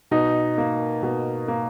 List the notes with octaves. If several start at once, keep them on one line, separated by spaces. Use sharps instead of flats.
B2 D#4
A#3
B2
A#3